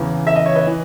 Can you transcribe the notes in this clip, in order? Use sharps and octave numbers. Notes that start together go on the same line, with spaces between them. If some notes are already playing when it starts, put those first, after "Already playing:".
Already playing: E2 C#3 E3
E5
D#5
C#5
B4 D#5
E3